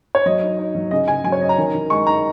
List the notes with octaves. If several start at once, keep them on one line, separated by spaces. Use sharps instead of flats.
C#5
F#3 D#5
D#4
D#4
F#3
C#3 D#5
C#3 G#5
F#3 G#5
C#5
C#4 D#5
A#5
D#3
D#3
G#3 C#6
D#4 A#5